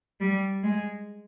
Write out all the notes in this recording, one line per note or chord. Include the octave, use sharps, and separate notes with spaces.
G3
G#3